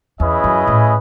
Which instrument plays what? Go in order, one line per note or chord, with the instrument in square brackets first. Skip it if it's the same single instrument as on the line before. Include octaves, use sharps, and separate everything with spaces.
[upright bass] E2 [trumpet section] C#4 E4 G#4 B4 D#5
[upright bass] F#2
A2